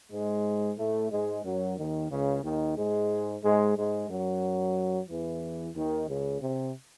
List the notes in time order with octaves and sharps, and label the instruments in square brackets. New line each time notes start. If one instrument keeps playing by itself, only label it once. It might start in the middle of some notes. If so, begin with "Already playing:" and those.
[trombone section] G#2 G#3
A2 A3
G#2 G#3
F#2 F#3
D#2 D#3
C#2 C#3
D#2 D#3
G#2 G#3
G#2 G#3
G#2 G#3
F#2 F#3
E2 E3
D#2 D#3
C#2 C#3
C3